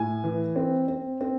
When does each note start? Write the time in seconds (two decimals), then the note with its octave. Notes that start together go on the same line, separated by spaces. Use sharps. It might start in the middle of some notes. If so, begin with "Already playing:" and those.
Already playing: A2 G#5
0.24 E3
0.56 C4
0.88 C4
1.21 C4